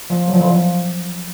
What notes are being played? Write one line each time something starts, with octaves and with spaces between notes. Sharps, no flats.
F3
F#3
F3
E3
F3